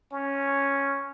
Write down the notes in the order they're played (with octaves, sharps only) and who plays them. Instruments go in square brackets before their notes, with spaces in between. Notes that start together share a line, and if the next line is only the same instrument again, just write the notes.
[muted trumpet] C#4